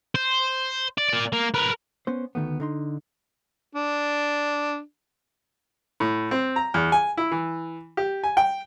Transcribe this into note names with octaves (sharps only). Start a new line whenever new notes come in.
C5
D5
A#3 D5
A#3
A#4 B4
B3 C#4 C5
D2 D#3 A3 B3
D3 D#4 C6
D4
A2
C4
A#5
E2
G#5
E4
E3
G4
G#5
G5